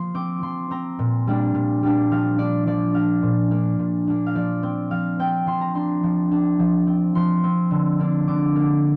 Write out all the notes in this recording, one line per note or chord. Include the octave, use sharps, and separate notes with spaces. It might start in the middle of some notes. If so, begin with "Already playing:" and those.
Already playing: F3 A#3 C6
C4 D6
F3 C6
C4 A#5
A#2
G3 A#3 D4
A#2
G3 A#3 D4
F3 F5
D4 D5
F3 D5
D4 F5
A#2
A#3 D4
A#2
A#3 D4
F5
F3 D5
C4
F3 F5
C4 G5
F3 C6
A#5
D4 C6
F3
D4
F3
C4
F3 C6
C4
D3
A#3 D4
D3 D6
A#3 D4